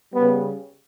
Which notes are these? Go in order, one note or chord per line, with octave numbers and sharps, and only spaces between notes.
C#3 G3 B3